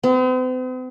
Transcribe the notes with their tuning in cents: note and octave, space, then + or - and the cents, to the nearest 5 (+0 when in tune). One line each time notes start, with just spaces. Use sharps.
C4 -45